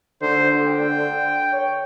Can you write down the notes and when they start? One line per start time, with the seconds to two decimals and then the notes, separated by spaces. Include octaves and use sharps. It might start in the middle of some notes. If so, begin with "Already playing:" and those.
0.22 D3 C5
0.66 G5
1.53 C#5